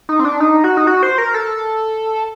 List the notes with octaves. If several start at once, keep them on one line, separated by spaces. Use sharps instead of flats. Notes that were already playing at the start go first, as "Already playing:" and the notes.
D#4
C4
D4
D#4
F#4
D#4
F#4
C5
A#4
A4